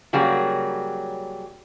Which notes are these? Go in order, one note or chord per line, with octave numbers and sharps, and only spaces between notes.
C#3 F#3 G3 A#3 G#4